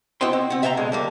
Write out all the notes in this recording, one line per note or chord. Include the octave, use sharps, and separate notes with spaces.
E4 F#4 C5 D#5 G5 C6
C4
C4 F#5
E5 F5 G5 A5 A#5
B2 D3 G#3
D3 G3 A#3